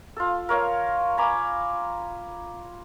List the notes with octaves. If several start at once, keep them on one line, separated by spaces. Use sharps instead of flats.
F4 A4
A#4 C#5 F5
G#5 A#5 B5 D6